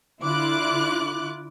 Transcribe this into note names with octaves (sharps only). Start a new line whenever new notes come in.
D3 E4 F4 D6 F#6